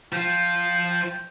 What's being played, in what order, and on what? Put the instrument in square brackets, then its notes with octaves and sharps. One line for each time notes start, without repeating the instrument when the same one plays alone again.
[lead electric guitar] F3 F4 [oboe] G5